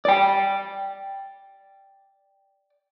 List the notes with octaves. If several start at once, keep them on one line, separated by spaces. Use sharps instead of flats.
D5 G5